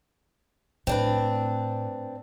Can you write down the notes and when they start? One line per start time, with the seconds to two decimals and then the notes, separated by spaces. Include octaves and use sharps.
0.87 A2 C4 D4 B4